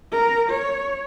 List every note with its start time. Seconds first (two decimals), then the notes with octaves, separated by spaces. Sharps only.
0.12 A#4
0.50 C#5